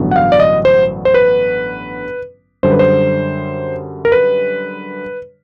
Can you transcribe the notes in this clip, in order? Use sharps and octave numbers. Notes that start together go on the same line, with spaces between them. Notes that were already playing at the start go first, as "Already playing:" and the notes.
Already playing: A1 G2 D3 F#3 B3
F#5
F5
D5
D#5
C5
C5
B4
F#2 D3 G3 C5
B4
C5
A#4
B4